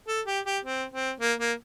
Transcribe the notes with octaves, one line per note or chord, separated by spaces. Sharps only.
A4
G4
G4
C4
C4
A#3
A#3